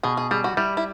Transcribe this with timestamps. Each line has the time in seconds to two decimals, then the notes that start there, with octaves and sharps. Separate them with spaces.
0.03 B2 G#4
0.17 G#4
0.31 G3 G#4
0.44 F#4
0.57 G3 E4
0.77 E4